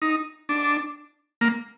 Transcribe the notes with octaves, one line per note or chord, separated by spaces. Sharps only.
D#4
D4
A#3